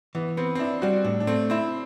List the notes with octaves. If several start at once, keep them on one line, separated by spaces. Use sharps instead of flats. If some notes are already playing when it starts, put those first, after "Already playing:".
E3 B3
B3 C4
C4
D4 E4
G3 F#4
A2 D4
D4
A3 C4
C4 E4